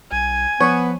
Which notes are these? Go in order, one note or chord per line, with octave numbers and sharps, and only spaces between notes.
B1 G#5
F3 B3 C#5